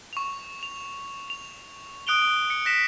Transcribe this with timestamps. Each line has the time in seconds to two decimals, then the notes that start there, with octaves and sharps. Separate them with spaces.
0.13 C#6 F7
0.63 F7
1.30 F7
2.07 D#6 F#6 D7 F7 G7
2.50 C#7
2.65 F#6 A#6 B6 E7